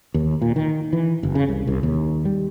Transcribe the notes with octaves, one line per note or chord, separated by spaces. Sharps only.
D#2
A#2
D#3
E3
F#1
C#3
C2
C2
D#2
G3